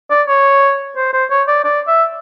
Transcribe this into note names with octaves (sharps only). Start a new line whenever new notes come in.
D5
C#5
C5
C5
C#5
D5
D5
E5